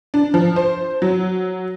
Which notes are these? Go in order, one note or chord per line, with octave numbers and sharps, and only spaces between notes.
D4
F3
C5
F#3